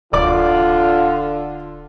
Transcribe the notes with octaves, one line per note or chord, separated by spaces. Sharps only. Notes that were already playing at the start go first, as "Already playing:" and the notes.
D1 D3 F4 D5 D6